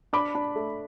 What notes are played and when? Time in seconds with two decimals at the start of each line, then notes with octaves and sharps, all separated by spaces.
0.13 D4 B5 D6
0.35 D4
0.56 A3